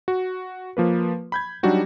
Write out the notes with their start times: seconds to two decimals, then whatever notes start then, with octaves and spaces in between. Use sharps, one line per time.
0.08 F#4
0.77 F3 A#3 B4
1.32 B5 G6 G#6
1.63 F#3 G3 D4 D#4 F#4 G4